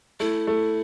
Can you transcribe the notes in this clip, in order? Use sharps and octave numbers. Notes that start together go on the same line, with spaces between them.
A3 E4
A3